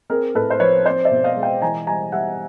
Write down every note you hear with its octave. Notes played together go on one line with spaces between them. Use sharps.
C4 G#4 A#4
A2 A4 B4
C5
F3 B4 C#5
C4 C5 D5
D5 E5
B2
D#5 F5
G#3
F5 G5
E3 G#5 A#5
G3 G#5 A#5
G3 E5 F#5